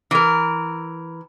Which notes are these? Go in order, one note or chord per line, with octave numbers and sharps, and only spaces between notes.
E3 A#4